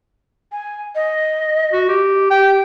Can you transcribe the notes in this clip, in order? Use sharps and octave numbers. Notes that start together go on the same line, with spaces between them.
G#5
D#5
F#4
G4
G4 G5